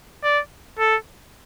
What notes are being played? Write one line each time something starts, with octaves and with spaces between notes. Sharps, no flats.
D5
A4